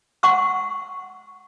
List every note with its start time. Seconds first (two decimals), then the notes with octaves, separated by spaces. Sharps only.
0.23 F#5 C6 C#6 E6